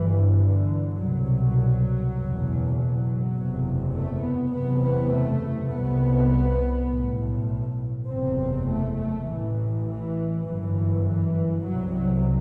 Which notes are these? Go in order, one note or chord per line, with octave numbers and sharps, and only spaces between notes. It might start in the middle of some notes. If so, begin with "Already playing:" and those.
Already playing: G1 G2 E3
D3
C2 B2 F#3
F#1 E2 B2
F#3
F#1 E2 C3
A3
B3
F#1 E2 C3 B3
B3
A3
C2 C3 B3
B1 A2
F#1 E2 C3 C4
A3
A3
A1 A2 E3
E3
G1 F#2 E3
E3
C2 C3 F#3
F#3